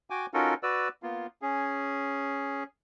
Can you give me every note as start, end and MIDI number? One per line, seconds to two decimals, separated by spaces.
0.10 0.26 66
0.10 0.26 79
0.10 0.26 80
0.10 0.26 86
0.34 0.54 61
0.34 0.54 63
0.34 0.54 65
0.34 0.54 66
0.34 0.54 69
0.34 0.54 70
0.63 0.88 66
0.63 0.88 71
0.63 0.88 74
0.63 0.88 88
1.03 1.27 58
1.03 1.27 59
1.03 1.27 65
1.42 2.64 61
1.42 2.64 68